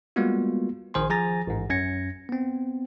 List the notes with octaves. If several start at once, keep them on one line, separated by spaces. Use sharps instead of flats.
G3 G#3 A#3 B3 F4 F#4
A#1 D#3 C5 G#5 C6
F3 G#4 G#5 A#5 A6 A#6
A1 G#2
F#2 C#4 G#6 A#6 C#7
B3 C4